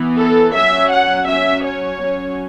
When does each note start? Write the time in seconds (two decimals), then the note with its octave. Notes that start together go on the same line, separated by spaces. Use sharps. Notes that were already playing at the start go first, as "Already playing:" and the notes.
Already playing: E3 B3
0.18 A4
0.55 F#3 C#4 E5
0.92 F#5
1.28 F#3 C#4 E5
1.66 C#5
2.02 F#3 C#4